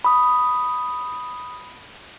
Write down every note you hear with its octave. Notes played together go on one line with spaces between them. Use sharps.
B5 D#6